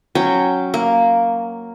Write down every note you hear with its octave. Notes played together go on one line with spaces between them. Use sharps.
F#3 C#4 G5
A#3